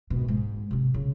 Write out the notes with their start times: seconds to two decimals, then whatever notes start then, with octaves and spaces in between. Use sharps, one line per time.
0.10 G#1 B2
0.28 G#2
0.71 C3 C4
0.94 C#3